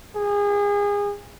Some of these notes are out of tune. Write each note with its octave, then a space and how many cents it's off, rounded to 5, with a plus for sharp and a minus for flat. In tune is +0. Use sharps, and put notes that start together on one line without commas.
G#4 -30